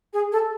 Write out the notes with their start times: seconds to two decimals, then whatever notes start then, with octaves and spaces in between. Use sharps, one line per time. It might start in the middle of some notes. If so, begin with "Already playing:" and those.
0.13 G#4
0.32 A4